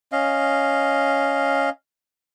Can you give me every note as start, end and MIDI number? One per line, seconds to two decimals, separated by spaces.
0.12 1.70 61
0.12 1.70 75
0.12 1.70 77